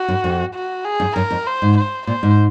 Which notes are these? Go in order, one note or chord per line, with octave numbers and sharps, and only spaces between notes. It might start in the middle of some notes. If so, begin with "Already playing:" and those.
Already playing: F#4
F#2
F2
F#4
G#4
F#2
F#2 A#4
F2
C5
G#2
C5
A#2 C5
G#2